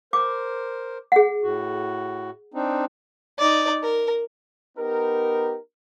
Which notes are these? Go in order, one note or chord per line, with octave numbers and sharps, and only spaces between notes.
A#4 C5 D6
G#4 F#5
A2 F#4
C4 D4 D#4
D#4 D5
A#4
B3 D#4 G4 A#4